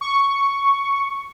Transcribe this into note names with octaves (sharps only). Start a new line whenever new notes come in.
C#6